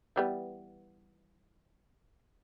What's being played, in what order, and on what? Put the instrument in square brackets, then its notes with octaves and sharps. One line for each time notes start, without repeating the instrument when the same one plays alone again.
[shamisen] E3 G3 B3